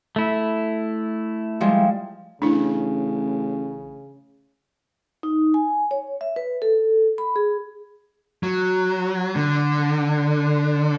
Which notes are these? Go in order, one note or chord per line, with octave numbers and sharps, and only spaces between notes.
A3 E4
F3 G3 G#3
A1 C#3 D4 E4
D#4
G#5
C#5
E5
B4
A4
B5
G#4
F#3
D3